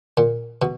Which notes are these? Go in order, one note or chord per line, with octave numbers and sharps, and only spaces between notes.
A#2
B2